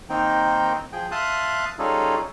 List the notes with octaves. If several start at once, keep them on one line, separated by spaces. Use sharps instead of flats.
D#3 A#3 C4 D#4 G5
F3 G#4 G5
E5 F5 A5 C6 D#6 F#6
G3 C#4 D#4 F4 G#4 A4